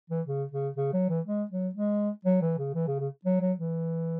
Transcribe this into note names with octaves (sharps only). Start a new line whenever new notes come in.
E3
C#3
C#3
C#3
F#3
E3
G#3
F#3
G#3
F#3
E3
C#3
E3
C#3
C#3
F#3
F#3
E3